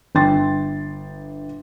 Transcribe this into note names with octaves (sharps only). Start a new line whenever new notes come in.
G1 G5 C6 A6